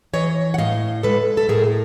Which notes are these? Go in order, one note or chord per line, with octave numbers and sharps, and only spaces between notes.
E3 C#5 D#5
F#5
A2 D#5 F5
G#3 A4 B4
A4
A2 G#4 A#4